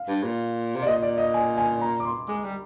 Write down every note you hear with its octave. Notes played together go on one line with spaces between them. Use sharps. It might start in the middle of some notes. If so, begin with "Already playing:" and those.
Already playing: F5
G2
A#2
C3
D5
A#2 D#5
D5
D#5
G#5
G#5
A#5
D6
C6
G#3 D6
G3